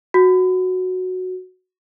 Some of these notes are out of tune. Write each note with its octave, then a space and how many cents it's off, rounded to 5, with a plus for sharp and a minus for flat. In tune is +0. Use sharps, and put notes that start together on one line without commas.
F#4 -5